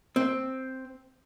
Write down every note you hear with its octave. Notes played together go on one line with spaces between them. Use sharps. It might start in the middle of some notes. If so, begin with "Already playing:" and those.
C4